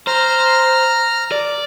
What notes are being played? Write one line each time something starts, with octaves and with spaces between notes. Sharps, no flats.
C5 A#5 F6
D5